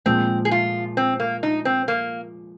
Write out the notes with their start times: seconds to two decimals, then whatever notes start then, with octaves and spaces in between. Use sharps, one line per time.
0.06 A#2 F3 G#3 C4
0.45 G#4
0.51 F4
0.97 C4
1.20 A#3
1.43 D#4
1.65 C4
1.88 A#3